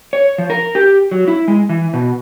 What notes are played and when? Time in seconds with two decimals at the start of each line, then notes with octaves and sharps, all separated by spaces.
0.13 C#5
0.38 F3
0.50 A#4
0.75 G4
1.11 F#3
1.28 E4
1.48 G#3
1.69 E3
1.94 B2